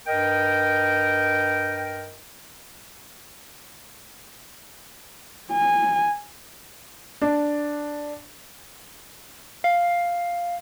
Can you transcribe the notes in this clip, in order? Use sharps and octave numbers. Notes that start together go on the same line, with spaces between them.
G2 A#4 D#5 G5
G#5
D4
F5